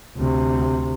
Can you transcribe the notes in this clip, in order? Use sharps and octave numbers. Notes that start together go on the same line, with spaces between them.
D2 C3